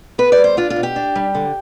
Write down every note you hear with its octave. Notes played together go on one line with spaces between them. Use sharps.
B3 B4
D5
G3
C5
D4 F4
F4
B2
G4
D4
G3
D3